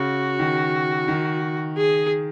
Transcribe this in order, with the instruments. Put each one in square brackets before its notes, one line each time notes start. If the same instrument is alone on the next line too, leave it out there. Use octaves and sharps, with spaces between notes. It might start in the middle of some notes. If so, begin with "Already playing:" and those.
Already playing: [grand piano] C#3 [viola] F#4
[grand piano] D#3
D#3
[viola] G#4